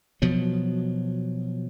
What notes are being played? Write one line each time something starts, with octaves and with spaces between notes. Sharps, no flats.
B2 F3 F#3